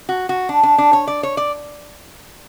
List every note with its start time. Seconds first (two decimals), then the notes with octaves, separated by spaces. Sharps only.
0.09 F#4
0.29 F#4
0.49 D4
0.63 D4
0.78 D4
0.93 C#5
1.07 D5
1.23 C#5
1.37 D5